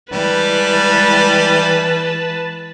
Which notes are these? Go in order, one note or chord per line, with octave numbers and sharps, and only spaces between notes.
E3 G3 G#3 B4 A5